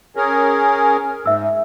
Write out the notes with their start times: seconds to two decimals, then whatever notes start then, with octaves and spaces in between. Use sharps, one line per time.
0.16 C#4 G#4 A#4
1.26 G#2 E5 E6